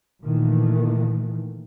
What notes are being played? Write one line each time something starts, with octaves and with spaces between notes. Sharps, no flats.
A#2 D#3 E3 A3